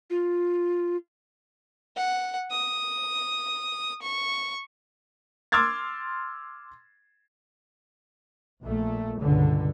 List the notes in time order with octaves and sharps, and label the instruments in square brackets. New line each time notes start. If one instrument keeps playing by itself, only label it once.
[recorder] F4
[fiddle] F#5
D#6
C#6
[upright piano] C6 D6 E6 F6 G#6 A6
[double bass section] A#1 A#2 A3
C#2 G2 B2 D3